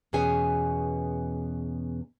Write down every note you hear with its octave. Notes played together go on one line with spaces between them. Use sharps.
E2 B2 B3 C#4 G#4 G#5